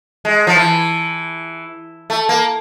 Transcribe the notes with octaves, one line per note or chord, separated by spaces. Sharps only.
G#3
F3
E3
A3
A#3